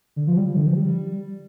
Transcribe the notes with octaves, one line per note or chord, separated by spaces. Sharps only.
D3
F3
G3
F3
D3
F3
G3